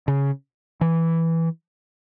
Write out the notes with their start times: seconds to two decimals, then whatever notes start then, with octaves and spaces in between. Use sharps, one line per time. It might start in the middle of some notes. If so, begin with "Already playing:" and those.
0.08 C#3
0.81 E3